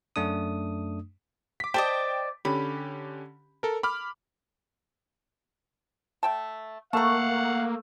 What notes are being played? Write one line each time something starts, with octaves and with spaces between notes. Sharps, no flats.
F#2 A3 D4 D#6
D6 B6
C5 D5 D#5 G5 A5
D3 C#4 G4 B5
A4 A#4
B5 D6 F6
A3 G5 A5
A3 A#3 F5 F#5 A5 A#5